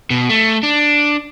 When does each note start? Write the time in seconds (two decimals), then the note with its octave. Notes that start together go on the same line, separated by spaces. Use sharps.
0.10 B2
0.29 A3
0.63 D4